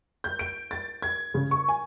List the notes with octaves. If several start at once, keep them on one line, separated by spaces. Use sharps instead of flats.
G6
D7
A6
G#6
C#3
C#6
G#5